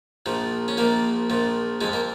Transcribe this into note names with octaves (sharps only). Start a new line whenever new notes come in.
A#1 A#2 F3
C#4
A#1 A#2 F3 A#3
A#1 A#2 F3
F2 F3 G#3
A#3